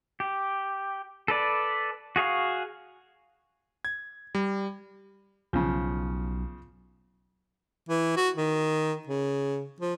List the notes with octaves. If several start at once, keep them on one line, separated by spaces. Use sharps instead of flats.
G4
A4 B4 D5
F#4 G#4 F5 C#6
G#6
G3
B1 C#3 F3
E3
F#4
D#3
C#3
F3